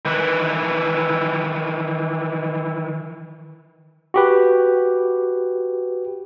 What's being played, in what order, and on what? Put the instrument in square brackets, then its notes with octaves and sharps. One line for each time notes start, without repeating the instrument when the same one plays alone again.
[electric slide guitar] D#3 E3 B4
[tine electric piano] F#4 G4 B4